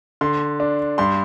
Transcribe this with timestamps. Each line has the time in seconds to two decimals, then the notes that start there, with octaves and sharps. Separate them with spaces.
0.21 D3 C6
0.60 D4
0.98 G2 C6